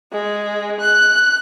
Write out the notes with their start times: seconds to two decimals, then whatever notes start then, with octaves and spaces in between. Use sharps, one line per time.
0.12 G#3
0.81 F#6